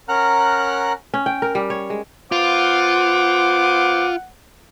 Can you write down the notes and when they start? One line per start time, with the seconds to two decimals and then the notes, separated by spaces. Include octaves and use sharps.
0.09 C#4 A#4 F#5 A#5 F6 F#6
1.14 C#4
1.26 G5
1.42 A#4
1.55 G3
1.70 C#5
1.90 G#3
2.32 B3 F4 C5 F#5 D6